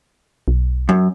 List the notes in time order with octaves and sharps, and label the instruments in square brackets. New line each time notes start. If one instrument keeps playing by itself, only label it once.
[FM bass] B1
[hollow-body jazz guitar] F#2